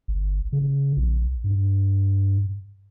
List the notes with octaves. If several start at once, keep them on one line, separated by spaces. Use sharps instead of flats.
G1
C#3
A#1
G2